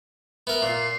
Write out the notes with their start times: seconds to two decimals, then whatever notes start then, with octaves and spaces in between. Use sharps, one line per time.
0.47 B3 A#4 E5
0.62 A#2 C7